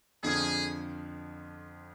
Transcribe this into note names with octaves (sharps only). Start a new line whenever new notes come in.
F2 D3 F3 G#4